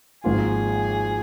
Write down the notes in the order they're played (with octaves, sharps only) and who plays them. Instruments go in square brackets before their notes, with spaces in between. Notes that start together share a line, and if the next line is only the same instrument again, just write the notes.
[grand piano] G#1 G#2 F3 A#3 F4 [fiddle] G#4